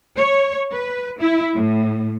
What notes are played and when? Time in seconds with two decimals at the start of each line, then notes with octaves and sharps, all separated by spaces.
0.17 C#5
0.73 B4
1.20 E4
1.55 A2